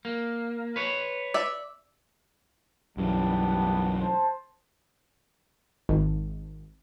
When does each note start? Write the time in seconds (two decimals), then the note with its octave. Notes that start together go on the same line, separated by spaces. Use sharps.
0.05 A#3
0.76 B4 C#5
1.34 D5 E5
2.97 B1 F#2 E3 G3 B3 A5
4.00 C5 A5
5.89 G#1